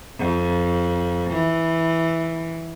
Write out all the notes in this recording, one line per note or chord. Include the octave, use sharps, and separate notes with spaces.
F2
E3